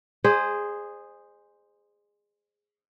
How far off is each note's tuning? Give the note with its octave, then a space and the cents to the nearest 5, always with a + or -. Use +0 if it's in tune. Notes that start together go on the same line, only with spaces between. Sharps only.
G#4 -10 C5 +0 D#5 -45